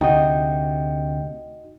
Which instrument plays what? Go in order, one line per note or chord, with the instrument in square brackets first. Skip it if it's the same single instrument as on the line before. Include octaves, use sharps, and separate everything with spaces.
[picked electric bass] D2 C3 [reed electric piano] D#4 F#4 D#5 [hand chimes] G5